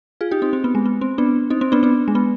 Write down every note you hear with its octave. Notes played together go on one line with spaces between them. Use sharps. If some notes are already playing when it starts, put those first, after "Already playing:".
F4 G#4
D#4 G4
C4 D#4
C4
B3
G#3
B3
C4
B3 D4
C4 D#4
C4
B3 D4
B3 D4
G#3
B3